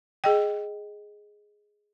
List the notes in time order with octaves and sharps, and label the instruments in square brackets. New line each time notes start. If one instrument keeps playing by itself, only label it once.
[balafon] G#4 D#5 G5